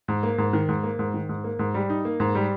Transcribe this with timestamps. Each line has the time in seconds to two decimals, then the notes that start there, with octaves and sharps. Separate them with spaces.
0.08 G#2
0.23 A#3
0.38 G#2
0.53 D#3
0.69 G#2
0.83 A#3
0.99 G#2
1.14 D#3
1.29 G#2
1.44 A#3
1.59 G#2
1.74 G3
1.90 D#4
2.05 A#3
2.20 G#2
2.35 G3